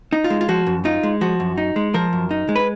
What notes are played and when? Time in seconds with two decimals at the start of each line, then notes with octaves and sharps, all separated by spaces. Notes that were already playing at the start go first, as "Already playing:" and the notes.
0.13 D#4
0.24 F4
0.30 G#3
0.41 F4
0.48 F3 F#4
0.67 F#2
0.85 D#4 F4
1.03 G#3
1.21 F3 F#4
1.40 F#2
1.58 D#4
1.76 G#3
1.94 F3 A#4
2.13 F#2
2.31 D#4
2.49 G#3
2.56 B4